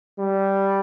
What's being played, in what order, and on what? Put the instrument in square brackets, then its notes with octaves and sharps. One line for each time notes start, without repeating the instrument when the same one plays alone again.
[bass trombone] G3